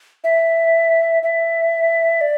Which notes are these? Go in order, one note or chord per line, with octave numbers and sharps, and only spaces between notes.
E5
E5
D5